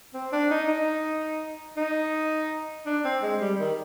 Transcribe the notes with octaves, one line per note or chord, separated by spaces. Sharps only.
C4
D4
D#4
D#4
D#4
D4
C4
G#3
G3
D#3